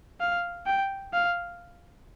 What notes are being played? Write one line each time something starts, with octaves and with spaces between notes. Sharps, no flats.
F5
G5
F5